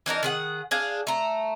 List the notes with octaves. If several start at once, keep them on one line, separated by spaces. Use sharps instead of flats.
E3 D4 D#4 A#4
D#3 G#4 F#5
D4 G#4 F5
A3 A#5